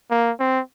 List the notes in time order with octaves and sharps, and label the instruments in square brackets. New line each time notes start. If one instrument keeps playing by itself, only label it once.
[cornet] A#3
C4